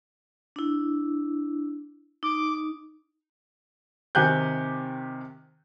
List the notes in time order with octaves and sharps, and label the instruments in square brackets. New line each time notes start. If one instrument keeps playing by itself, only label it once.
[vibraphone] D4 E4
[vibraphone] D#4 [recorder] D6
[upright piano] C3 D#3 G4 G#5 F#6 G6